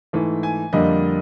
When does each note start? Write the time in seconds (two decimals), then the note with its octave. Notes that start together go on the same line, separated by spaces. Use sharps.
0.13 G#2 E3 A3
0.43 G#5
0.73 F2 D3 G3 A#3 D#5